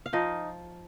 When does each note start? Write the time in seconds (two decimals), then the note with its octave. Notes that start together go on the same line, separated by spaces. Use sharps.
0.06 F5
0.13 F3 D#4 D#5